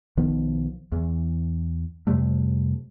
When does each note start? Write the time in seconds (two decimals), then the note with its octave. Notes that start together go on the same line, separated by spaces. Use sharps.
0.17 B1 D#3 F3 B3
0.92 E2 E3
2.07 F2 C3 G3 A3